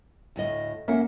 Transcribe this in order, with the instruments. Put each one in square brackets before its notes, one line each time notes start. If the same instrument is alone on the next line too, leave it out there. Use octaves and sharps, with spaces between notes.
[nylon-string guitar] D2 A2 D#5
[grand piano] A#3 C#4 [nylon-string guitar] E5 F#5